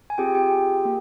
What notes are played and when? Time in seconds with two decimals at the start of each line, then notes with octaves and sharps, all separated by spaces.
0.10 G#5
0.18 C4 F4 G4 G#4 G5
0.35 G4 G5
0.85 A#3